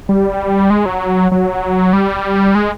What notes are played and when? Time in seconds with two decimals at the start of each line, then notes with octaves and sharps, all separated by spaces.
0.09 G3
0.70 G#3
0.86 F#3
1.32 F#3
1.93 G3
2.55 G#3